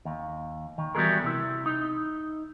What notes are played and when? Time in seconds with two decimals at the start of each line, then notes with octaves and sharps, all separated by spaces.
0.05 D#2
0.78 D#3
0.95 E3 G3 B3 F#4 G#4 A#4
1.24 C3 E4
1.66 D#4